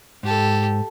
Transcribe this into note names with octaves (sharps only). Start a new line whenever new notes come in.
G#2 G4 A4